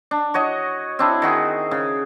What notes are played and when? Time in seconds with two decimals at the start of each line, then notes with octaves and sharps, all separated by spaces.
0.11 D4
0.34 F#4 C#5 D#5
0.99 C4 D4 E4
1.22 D#3 F#4 G#4
1.71 C#3